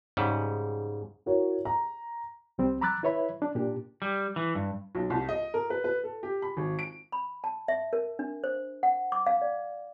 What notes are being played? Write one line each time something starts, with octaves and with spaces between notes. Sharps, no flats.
G#2 C#3 G3
E4 F#4 A#4 C#5
A#5
C2 G3 C4
A#5 B5 D6 E6 F#6 A6
E4 B4 C#5 E5 B5
D4
A#2 D4 G4
G3
E3
G2
B1
C2
D#5
A#4
B4
B4
A4
G4
B5
G#1
D7
B5
A5
E5
A#4
D4
C5
F#5
D6
F5
D5